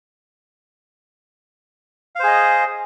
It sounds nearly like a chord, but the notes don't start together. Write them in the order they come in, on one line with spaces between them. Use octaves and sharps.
F5 C5 G#4 D#5